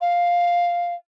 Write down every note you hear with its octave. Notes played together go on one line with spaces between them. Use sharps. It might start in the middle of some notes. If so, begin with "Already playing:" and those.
F5